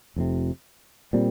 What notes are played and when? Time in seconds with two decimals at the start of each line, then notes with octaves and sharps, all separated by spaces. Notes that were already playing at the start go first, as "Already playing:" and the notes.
0.16 F1 F2 C3
1.13 A#2 G3 C4